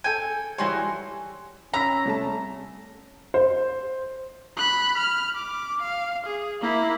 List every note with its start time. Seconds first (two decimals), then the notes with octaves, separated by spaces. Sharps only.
0.04 A4 G5 G#5
0.58 E3 G3 F#4 G#4 C#5 C6
1.74 C#4 A#5 B5 E6 B6
2.05 C2 A3 A5
3.34 C5
4.57 B5 F#6
4.98 F6
5.36 D6
5.82 F5
6.27 G#4
6.61 A#3 E4